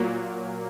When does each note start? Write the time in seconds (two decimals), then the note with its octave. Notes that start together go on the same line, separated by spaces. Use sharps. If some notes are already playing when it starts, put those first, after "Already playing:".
Already playing: A#2 F#3 A#3